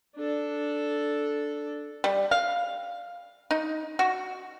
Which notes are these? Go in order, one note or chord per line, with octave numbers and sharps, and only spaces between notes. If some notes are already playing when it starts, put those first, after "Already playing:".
D4 A4
G3
F5
D#4
F#4